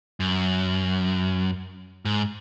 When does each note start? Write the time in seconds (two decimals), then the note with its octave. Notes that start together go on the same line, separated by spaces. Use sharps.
0.20 F#2
2.05 G#2